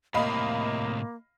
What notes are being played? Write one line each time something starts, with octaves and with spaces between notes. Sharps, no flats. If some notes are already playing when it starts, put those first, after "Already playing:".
A2 C3 A#3 D#5 F5 B5